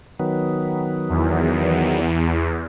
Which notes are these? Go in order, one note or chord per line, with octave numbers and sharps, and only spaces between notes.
D#3 F#3 B3
E2